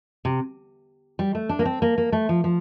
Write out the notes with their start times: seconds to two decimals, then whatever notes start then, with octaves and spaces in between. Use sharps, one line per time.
0.25 C3
1.19 G3
1.35 A3
1.49 D4
1.59 A#3
1.65 C4
1.82 A#3
1.98 A#3
2.12 A3
2.29 F3
2.44 F3